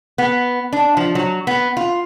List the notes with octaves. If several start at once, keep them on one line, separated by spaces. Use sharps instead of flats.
B3
D4
F3
F#3
B3
F4